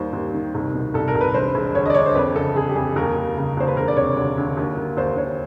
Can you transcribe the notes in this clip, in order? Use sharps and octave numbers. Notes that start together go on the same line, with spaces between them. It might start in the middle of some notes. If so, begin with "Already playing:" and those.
Already playing: D#2 D#3 G3 C5
D#2
D#3
C2
B2
C2 A4
A#4
C2
B4
E1 C5
E1
D2 C#5
D#5
D5
E1 C#5
C5
F2 B4
C#3 A4
F2 G#4
G4
F2 G#4
D#2 A#4
D#2
C#3
D#2 C5
B4
E1 A#4
D5
C3 C#5
D2
D2
D#2
D#2
D#2 C5
D#2 C#5